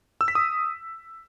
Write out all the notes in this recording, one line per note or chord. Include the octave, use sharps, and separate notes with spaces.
E6
B6
D#6